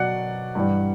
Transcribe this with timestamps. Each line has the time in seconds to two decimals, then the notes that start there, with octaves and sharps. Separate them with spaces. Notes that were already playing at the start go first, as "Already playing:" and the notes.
Already playing: B2 F#3 D5 F#5 F#6
0.55 G2 E3 G3